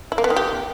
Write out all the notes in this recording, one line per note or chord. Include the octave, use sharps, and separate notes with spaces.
E4
A#3
B3
D#3
G4